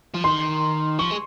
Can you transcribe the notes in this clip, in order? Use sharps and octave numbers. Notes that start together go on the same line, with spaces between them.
F3
D#3 C6
F3 C#6
G#3